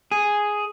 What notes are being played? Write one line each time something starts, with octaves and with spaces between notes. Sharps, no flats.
G#4